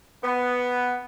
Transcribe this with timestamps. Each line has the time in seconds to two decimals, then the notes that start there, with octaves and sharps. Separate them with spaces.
0.23 B3